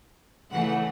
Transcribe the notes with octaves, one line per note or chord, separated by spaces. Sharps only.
C#3 E3 A3 F#5